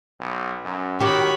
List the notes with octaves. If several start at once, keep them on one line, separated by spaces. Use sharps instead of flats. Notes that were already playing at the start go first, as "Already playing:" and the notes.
B1
F#2
D#3 F#4 G4 C#5 B5